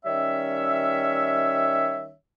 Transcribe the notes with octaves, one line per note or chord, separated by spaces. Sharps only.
D#3 G3 C#4 C#5 E5